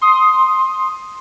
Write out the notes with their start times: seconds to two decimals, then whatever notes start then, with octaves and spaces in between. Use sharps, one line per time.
0.01 C6 D#6